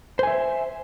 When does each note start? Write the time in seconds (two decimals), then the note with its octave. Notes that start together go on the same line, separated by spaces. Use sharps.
0.19 C5
0.23 G#5
0.27 E5